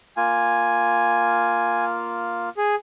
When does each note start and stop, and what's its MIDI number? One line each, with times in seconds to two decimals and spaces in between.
0.17 2.49 58
0.17 2.49 65
0.17 1.85 80
2.57 2.75 68